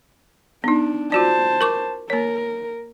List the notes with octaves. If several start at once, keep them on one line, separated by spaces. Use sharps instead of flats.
B3 D4 D#4
F4 F#4 C5 D5 A5
A#4 C#6 D6
A#3 A#4 C#5